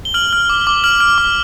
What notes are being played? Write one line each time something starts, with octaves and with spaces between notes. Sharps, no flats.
G7
F6 F#7
F6
D6
D6
F6 F#7
F6
D6